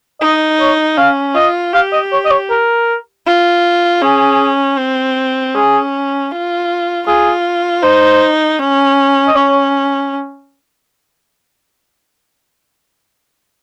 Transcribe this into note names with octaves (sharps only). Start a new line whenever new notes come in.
D#4 D#5
C#5
C#4 F5
F4 D#5
G4 F5
D#5
C#5
D#5
C#5
A#4
F4
C#4 G#4
C4
C#4 G#4
F4
F4 G#4
D#4 C5
C#4
D#5
C#4 C#5